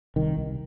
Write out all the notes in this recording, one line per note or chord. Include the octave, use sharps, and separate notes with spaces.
C2 D#3
C2